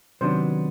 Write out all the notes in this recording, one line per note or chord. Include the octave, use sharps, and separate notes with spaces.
C3 D#3 F#3 B3 D4 C5